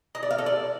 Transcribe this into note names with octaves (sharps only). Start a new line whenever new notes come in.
D#5
D5
F5
A4
D5